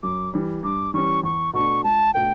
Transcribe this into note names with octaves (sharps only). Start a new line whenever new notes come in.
F#2 D6
E3 G3
G2 D6
E3 G3 C#4 C#6
E2 C#6
B2 A3 D4 C#6
C#2 A5
B2 A3 D4 A4 G5